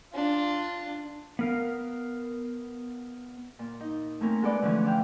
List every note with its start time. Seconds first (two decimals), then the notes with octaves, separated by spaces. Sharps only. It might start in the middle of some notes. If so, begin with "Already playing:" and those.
0.13 D4 F4
1.39 B3 A#4 F5
3.59 A#2
3.80 D#4
4.21 A3 A#3 C4 C#4 A#4
4.42 G#3 B3 A4 B4 D5
4.62 D3 E3 F3 A3 C#4
4.84 D5 E5 F5 G5